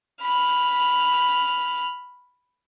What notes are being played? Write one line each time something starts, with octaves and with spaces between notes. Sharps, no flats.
B5 F6